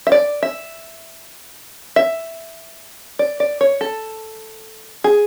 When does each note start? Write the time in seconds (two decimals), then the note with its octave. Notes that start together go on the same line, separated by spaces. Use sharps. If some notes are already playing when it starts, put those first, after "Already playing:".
0.07 E5
0.12 D5
0.43 E5
1.96 E5
3.19 D5
3.40 D5
3.61 C#5
3.81 A4
5.04 G#4